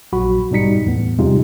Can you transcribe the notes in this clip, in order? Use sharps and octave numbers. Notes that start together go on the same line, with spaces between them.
A#1 F#3 F#4 B5
G#2 B2 G3 D#4 B6 C#7
E2 A2 B3
C3 F3 G3 G#3 D#4 F4